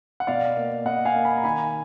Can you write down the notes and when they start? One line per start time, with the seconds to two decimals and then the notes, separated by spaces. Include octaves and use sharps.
0.20 F#5
0.27 B2 D5 F5
0.56 A#3
0.85 B2 D#5 F#5
1.05 F5 G#5
1.15 A#3
1.25 G#5 B5
1.37 A#5
1.44 D#3 G#5 B5